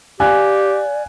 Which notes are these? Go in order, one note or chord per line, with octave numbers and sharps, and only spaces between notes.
G4 D5 F5 G#5 F#6